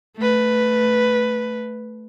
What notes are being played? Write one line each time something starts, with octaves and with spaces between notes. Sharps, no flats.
A3 B4